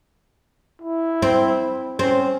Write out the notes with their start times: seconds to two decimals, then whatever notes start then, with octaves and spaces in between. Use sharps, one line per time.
0.82 E4
1.22 C4
1.99 C4 C#4